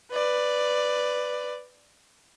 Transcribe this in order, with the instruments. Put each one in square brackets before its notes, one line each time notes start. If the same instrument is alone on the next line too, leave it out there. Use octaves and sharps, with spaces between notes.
[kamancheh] B4 D5